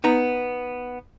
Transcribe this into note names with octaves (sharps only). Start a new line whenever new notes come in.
B3 D#4 A#5